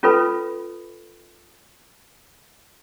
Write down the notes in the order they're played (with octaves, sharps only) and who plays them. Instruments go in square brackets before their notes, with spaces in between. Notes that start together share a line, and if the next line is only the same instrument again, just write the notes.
[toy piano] C#4 F4 A4 B4 B5